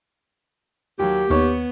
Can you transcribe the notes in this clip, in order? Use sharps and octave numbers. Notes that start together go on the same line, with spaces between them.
D#2 F#3 G4
D#2 B3 C#5 C#6